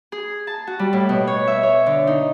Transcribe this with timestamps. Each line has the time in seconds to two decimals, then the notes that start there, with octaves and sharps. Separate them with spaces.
0.12 G#4
0.47 A5
0.67 F#4
0.79 G3
0.93 A2
1.09 B2
1.27 C#5
1.47 E5
1.63 C#5
1.86 D3
2.07 D#4